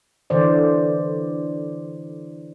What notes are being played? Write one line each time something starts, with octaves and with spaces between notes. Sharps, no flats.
D3 E3 C5 D5